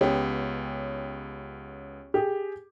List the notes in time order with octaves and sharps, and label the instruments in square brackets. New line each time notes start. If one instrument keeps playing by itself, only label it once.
[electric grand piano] C#2 B3 [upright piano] C#4 G4
[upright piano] G4 G#4